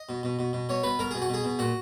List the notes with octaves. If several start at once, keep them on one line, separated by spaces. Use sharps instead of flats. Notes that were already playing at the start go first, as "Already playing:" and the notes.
Already playing: D#5
B2
B2
B2
B2
B2 C#5
B2 B4
B2 A#4
B2 G#4
F#4
B2 G#4
B2
A#2 F#4